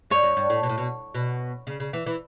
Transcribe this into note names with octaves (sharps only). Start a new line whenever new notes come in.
G2 C#5
F#2
G2
A2
B2
A2
B2
B2
C#3
C#3
E3
E3